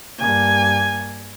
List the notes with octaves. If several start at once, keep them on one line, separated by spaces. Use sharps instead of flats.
G2 A#3 G#5